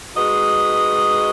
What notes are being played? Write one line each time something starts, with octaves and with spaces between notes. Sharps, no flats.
G#3 D#4 F#4 B4 D#5